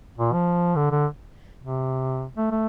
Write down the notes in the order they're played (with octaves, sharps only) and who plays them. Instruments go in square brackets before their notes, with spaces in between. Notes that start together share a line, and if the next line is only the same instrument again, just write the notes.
[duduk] A#2
F3
D3
D3
C3
A3
A3